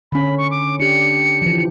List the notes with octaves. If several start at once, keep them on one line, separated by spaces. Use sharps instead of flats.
D3 C#4 B5
C#6
D6
D4 G4 C#7
E3 F3